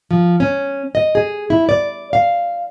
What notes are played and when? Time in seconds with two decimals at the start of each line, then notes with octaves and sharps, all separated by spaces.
0.11 F3
0.40 C#4
0.95 D#5
1.15 G#4
1.50 E4
1.69 D5
2.13 F5